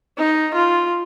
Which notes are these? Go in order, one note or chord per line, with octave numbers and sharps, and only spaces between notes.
D#4
F4